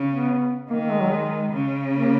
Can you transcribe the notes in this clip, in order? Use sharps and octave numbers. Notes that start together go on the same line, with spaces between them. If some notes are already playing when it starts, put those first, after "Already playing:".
Already playing: C#3
B3
D#3 A#3
A#3
G#3
F#3
G#3
C#3
A#3